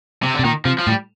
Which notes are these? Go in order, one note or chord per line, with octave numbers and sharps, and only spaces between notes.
C3
D3
C3
A#2 D#3
C3 F3
F3
A2 G3